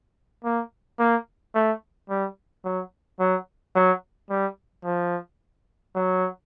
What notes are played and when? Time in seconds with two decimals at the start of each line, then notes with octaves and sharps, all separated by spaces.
0.45 A#3
1.00 A#3
1.55 A3
2.10 G3
2.65 F#3
3.20 F#3
3.75 F#3
4.30 G3
4.84 F3
5.95 F#3